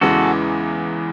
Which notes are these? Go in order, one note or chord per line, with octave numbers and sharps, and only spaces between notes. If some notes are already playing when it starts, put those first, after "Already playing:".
E2 C#3 E3 G#3 F#4 A4